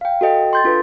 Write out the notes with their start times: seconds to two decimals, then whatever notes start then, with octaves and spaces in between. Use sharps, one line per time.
0.01 F5 G5
0.21 F#4 A4 D#5 G5
0.53 C6 G6 A6
0.64 D4 F4 A4 B4